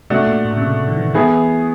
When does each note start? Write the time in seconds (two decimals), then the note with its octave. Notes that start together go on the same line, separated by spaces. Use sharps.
0.10 C3 A3 D4 F#4
0.27 A#2
0.45 A2
0.57 C#3
0.62 C3
0.88 D#3
0.96 E3
1.10 D#3
1.14 E3 B3 E4 G#4